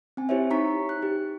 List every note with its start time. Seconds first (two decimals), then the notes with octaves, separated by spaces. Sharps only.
0.17 C4 G#5
0.29 E4 G4 C5 C#5 E5
0.50 D#4 A#5 C#6 B6
0.89 F#6
1.02 G4